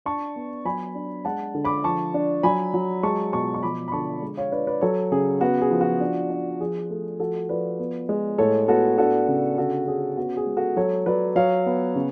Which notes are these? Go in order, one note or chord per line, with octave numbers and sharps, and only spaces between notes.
D4 A5 C#6
B3
F#3 G#5 B5
D4
G#3 F#5 A5
D3
B5 D6
F3 A5 C#6
D4
F#3 G#5 B5
F#3
G#3 A5 C#6
B2 A5 C#6
C#6
F3 B5 D6
B5
D3 A5 C#6
G#3
C#5 F5
D4 B4 D5
B4 D5
F#3 A4 C#5
C#3 G#4
B3 F#4
G#4
F3
F#4
D4
D4
F3 G#4
A3
F3 F#4 A4
F3 B4 D5
B3
G#3
A2 A4 C#5
B3 F#4 A4
D4 F#4 A4
C#3
D3 F#4 A4
C#4 G#4
B3 F#4
G#4
G#3
F#4 A4
F#3 A4 C#5
F#3 B4 D5
F#3 C#5 F5
B3
C#3